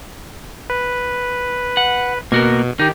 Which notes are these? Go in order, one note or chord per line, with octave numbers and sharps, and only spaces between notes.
B4
F#5
B2 A#3 F#4 A#4
D#3 D#4 G4